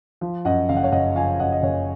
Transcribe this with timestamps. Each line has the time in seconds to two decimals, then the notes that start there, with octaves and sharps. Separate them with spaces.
0.21 F3
0.45 F#2 D#5 F#5
0.69 F#1 F5
0.76 F#5
0.83 C#5 F5
0.92 F#1 D#5 F#5
1.16 F3 F5 G#5
1.39 F#2 D#5 F#5
1.52 D#5
1.62 F#1 C#5 F5